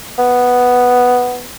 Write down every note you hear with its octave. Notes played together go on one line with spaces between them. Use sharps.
B3